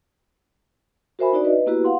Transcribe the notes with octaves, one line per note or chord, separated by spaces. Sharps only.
F#4 A#4 C5 E5 G#5 B5
D4 D#4 F#4 D5 E5
B4 D#5
A#3 B3 E4 F#4 G4 B4
F5 F#5 C6